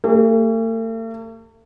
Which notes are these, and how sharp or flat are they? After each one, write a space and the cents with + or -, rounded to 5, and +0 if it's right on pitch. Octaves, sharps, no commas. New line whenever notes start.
A3 +45 G#4 -40